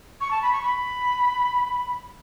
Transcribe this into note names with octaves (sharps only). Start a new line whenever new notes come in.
C#6
A5
B5
C#6
B5